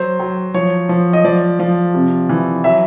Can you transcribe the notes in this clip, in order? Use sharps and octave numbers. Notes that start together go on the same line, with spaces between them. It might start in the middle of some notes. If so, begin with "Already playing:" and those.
Already playing: F#3 C5
F#3
F3 C#5
F3
D#5
F3 D5
F3
C3
E3
F#3 E5